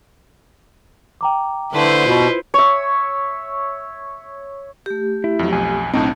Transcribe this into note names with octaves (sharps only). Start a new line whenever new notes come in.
G5 A#5 D6
D3 A3 E4 B4 C5
B2 F4 B5
C#5 E5
A3 G4
E4
F2 F#3
B1 F2 G#5
B1 A2 C4 D4 D#4 A5